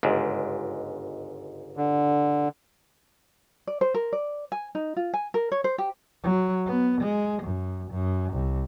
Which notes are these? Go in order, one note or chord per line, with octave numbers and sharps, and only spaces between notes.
G1 C#2 G#2
D3
D5
C5
A#4
D5
G#5
D#4
F4
G#5
A#4
C#5
C5
G4
F#3
B3
G#3
F#2
F#2
C2